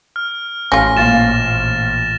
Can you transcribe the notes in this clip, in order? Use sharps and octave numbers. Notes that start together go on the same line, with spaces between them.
F6
A1 C#4 F4 A#6
A#1 A#2 F5 A6 E7